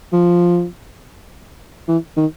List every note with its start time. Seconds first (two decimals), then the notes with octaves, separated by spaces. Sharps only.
0.13 F3
1.88 E3
2.17 D#3